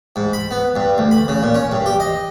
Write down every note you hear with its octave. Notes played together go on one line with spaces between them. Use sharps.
G#2
B5
B3
G2
D2
B5
C#3
A#2
C#4
G2
G4
D#5